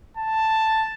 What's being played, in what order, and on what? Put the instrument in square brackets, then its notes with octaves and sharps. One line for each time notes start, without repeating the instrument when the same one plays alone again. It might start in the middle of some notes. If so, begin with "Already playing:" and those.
[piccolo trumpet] A5